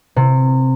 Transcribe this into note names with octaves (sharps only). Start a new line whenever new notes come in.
C3